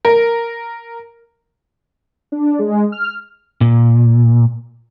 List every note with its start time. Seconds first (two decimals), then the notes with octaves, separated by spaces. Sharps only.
0.05 A#4
2.32 D4
2.59 G#3
2.92 F6
3.61 A#2